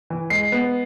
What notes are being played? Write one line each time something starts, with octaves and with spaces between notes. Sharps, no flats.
E3
G#3 C7
B3